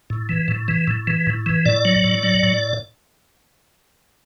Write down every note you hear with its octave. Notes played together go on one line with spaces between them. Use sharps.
A2
E3
A2
E3
A2
E3
A2
E3
A2 D5
F#3
A2
F#3
A2